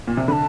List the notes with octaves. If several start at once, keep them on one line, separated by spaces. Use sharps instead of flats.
A#2
C3
D3 A5 B5